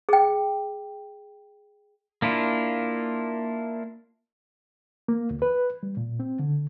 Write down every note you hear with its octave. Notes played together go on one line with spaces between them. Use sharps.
G#4 G5
A#3 D4 E4 F4
A#3
D2
B4
G3
A#2
C4
D3